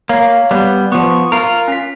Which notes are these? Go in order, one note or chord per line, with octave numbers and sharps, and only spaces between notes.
A#3 C#5 F5
G3 B3
F3 B3 C#6
F4 A#4
C#4 B6